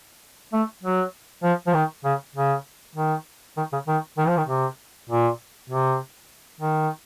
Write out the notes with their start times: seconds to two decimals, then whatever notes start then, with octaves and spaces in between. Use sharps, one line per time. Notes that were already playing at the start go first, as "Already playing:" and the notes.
0.53 A3
0.83 F#3
1.43 F3
1.67 F3
1.74 D#3
2.04 C#3
2.35 C#3
2.95 D#3
3.57 D#3
3.72 C#3
3.88 D#3
4.18 D#3
4.28 F3
4.37 D#3
4.47 C3
5.09 A#2
5.70 C3
6.60 D#3